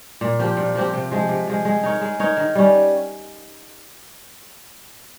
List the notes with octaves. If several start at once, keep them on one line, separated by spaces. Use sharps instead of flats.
A#2
F3 C4 G4
A#2
F3 C4 G4
C3
F3 G#3
C3
F3 G#3
G#3
D#4 A#4 C#5
G#3
D#4 A#4 C#5
D#3
G3 C#4